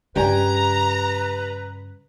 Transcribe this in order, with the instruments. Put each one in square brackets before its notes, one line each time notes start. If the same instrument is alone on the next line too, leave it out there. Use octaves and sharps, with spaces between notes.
[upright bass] G2 C#3 [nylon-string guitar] G4 D5 G#5 [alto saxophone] B4 [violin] A#5